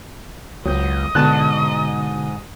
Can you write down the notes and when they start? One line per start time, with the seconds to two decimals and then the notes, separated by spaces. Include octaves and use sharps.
0.66 C#2 F#3 C4 D#5 G6
1.15 G#2 B2 D3 F#4 A5 F#6